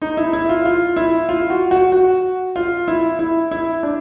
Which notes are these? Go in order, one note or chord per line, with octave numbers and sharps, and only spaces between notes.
D#4
E4
E4
F4
F4
E4
F4
F#4
F#4
F#4
F4
E4
E4
E4
D4